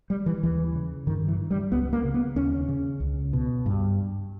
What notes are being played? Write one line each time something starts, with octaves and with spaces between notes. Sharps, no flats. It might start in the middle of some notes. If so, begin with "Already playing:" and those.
G3
E3
D#2 E3
C#3
G2 D#3
E3
G3
C#2 B3
A#3
C#3
B3
D#2 C#4
C#3
C#2
B2
G2